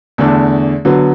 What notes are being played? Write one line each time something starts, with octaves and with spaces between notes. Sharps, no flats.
E2 D3 A3 D4
D3 F#3 B3